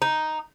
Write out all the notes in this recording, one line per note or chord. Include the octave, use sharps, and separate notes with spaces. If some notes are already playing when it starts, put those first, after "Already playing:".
D#4